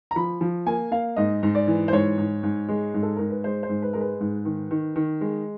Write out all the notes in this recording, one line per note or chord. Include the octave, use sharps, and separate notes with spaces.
A#5
F3 B5
F3
A#3 G#5
A#3 F5
G#2 D#5
G#2
D5
E3
C5
G#2 C#5
G#2
G#2
G#3
G#2
A4
G#2 A#4
B4
G#3 C5
C5
G#2
B4
G#3 A#4
B4
G#2
D#3
D#3
D#3
G#3